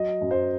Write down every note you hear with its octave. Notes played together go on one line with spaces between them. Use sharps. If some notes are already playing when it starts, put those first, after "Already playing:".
Already playing: F#3 D#5
F#2
C5